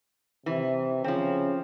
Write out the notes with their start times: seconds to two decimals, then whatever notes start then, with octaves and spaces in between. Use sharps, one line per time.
0.46 C3 E3
1.04 C#3 F3 C4